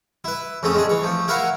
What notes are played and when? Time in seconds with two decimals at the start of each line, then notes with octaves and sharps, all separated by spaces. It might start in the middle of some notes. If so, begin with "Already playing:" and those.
0.24 E4 B4
0.63 F2 C#3 A3 C#4 D#6
0.75 G#3 D4 G#4
0.89 E3 C#5
1.03 F3 A3
1.28 E4 A#4 B4 C#5 F5 F#5